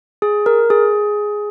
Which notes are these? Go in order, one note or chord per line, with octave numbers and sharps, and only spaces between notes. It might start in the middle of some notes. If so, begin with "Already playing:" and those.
G#4
A#4
G#4